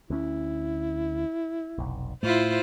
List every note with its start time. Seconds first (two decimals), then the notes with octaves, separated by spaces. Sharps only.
0.10 D2 C#4 E4
1.78 F1 B1
2.23 A2 A3 E4 F4 C5